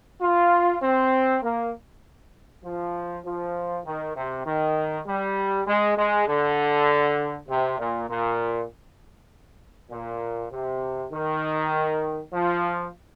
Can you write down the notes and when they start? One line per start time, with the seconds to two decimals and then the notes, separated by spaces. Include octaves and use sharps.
0.22 F4
0.83 C4
1.43 A#3
2.65 F3
3.25 F3
3.86 D#3
4.16 C3
4.46 D#3
5.07 G3
5.67 G#3
5.98 G#3
6.28 D3
7.49 C3
7.79 A#2
8.09 A#2
9.91 A#2
10.52 C3
11.12 D#3
12.34 F3